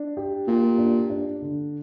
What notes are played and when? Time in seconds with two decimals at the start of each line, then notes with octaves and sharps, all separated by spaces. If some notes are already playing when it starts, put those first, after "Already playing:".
Already playing: D4
0.17 G4
0.47 A#2 G4
0.78 D4
1.10 D4
1.42 D3